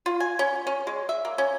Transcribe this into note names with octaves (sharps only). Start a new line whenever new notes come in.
F4
G#5
C#4
C#4
G#3
E5
A#3
C#4